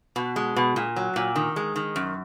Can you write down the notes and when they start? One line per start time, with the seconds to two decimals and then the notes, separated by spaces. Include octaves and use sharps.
0.16 B2
0.36 G#3
0.56 B2
0.76 A#2
0.96 F#3
1.16 A#2
1.36 D#3
1.56 G#3
1.76 D#3
1.96 F#2